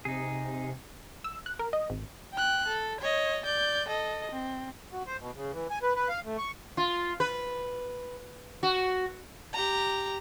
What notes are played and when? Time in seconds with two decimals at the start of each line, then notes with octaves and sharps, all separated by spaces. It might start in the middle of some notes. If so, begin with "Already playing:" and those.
0.05 C3 D#4 G#4
1.24 E6
1.46 F#6
1.59 A#4
1.73 D#5
1.90 G#1
2.34 G5 F#6
2.68 A4
3.01 C#5 D#5
3.45 D5 G6
3.88 A4 D#5
4.32 C4
4.92 F#4
5.07 C5
5.20 B2
5.35 C#3
5.52 E3
5.70 G#5
5.82 B4
5.96 B4
6.09 F5
6.25 A3
6.38 C#6
6.77 F4
7.20 B4
8.63 F#4
9.53 G4 A#5